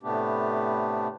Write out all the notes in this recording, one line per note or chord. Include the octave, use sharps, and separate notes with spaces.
A2 C3 A3 B3 D4 G4